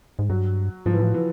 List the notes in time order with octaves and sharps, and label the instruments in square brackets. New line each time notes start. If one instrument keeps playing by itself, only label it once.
[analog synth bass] G#2
[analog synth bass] G2 [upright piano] F#3
[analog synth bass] G#2 [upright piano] F3
[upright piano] E3
[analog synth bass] A2 [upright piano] F3
[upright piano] E3